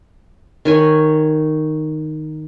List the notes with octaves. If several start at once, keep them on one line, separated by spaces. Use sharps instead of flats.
D#3 C#5 G#5